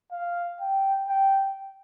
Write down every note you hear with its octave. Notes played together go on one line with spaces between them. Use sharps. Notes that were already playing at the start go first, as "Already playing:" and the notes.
F5
G5
G5